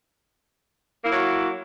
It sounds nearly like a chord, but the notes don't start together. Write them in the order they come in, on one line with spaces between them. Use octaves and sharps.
A#3 E4 F#3